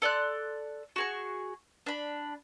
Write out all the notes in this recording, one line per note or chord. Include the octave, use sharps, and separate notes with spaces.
A4 D5 C6 F#6
F#4 G#4 C#6
D4 B5